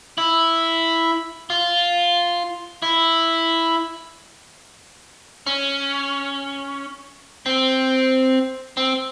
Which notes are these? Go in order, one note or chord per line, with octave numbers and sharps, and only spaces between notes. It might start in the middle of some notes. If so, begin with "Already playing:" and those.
E4
F4
E4
C#4
C4
C4